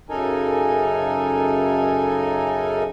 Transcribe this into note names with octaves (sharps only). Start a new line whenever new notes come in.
F#2 C#3 D#4 A4 A#4 G#5